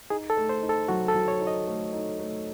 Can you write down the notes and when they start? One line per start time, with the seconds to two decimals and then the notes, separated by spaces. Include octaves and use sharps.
0.10 D#4 G#4
0.30 A4
0.37 A3
0.49 C5
0.62 D#4
0.69 A4
0.88 F#3 F#4
1.08 A4
1.15 F#3
1.28 C#5
1.41 D#4
1.47 D#5
1.67 A3
1.93 D#4
2.20 A3